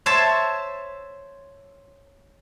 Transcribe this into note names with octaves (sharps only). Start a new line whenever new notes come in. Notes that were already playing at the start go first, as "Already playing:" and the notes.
C5 C#5 E5 A5